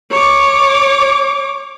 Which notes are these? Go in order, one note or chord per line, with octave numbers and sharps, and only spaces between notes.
C#5 D6